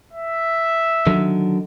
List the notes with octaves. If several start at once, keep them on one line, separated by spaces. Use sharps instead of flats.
E5
D3 D#3 F#3